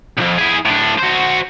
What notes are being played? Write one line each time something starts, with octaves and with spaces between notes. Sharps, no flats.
C2 F2
E4 G#4
A2 D4
F#4 C5